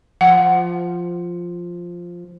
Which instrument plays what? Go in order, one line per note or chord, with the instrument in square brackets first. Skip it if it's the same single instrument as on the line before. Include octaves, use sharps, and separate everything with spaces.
[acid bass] F3 [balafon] F#5